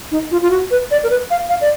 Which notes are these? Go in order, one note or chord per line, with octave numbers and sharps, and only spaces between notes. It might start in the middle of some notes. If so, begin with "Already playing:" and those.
D#4
F4
F4
F#4
B4
D5
A#4
B4
F5
F5
D5